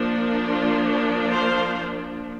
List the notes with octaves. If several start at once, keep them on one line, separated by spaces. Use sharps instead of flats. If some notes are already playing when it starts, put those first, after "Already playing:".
Already playing: F3 A#3 D4
F4
C5 F5